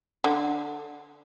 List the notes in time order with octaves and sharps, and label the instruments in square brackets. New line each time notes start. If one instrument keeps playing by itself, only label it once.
[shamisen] D3